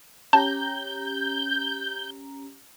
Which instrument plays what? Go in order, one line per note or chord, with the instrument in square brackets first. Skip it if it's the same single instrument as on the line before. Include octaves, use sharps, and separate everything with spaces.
[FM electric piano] C#4 G4 A#5 [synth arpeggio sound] A5 [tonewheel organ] G6